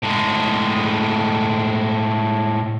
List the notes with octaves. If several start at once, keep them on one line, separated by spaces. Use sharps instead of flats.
A2 G#3